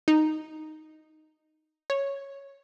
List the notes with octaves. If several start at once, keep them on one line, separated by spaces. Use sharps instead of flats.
D#4
C#5